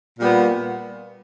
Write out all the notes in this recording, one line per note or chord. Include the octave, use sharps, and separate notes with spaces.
A#2 G3 B3